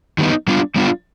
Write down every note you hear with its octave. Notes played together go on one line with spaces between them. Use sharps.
D#3 G3 B3 D#4
G3 B3 D4 F4
G3 B3 D4 F4